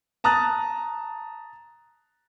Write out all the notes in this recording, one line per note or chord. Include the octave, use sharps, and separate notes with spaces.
A5 A#5 D#6 F#6 A6